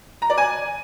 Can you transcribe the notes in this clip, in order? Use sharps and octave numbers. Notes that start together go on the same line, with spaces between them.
A#5
D5
G#5